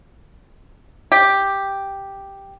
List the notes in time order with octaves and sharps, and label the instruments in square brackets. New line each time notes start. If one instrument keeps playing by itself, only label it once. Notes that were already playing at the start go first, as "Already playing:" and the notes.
[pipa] G4